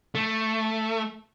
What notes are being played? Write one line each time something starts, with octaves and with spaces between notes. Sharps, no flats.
A3